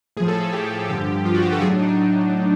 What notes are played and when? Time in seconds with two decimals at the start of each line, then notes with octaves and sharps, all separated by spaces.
0.17 A2 F3 G#4
0.28 A4
0.41 G#4
0.53 A2 F3 G4
0.89 G2 D3 F3 G4
1.24 G2 D3 F3 F4
1.35 F#4
1.42 G4
1.52 A4
1.61 A2 F#3 G#4
1.69 D4
1.79 D#4
1.88 D4